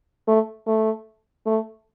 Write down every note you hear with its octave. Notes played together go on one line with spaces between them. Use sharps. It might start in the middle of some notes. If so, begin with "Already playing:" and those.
A3
A3
A3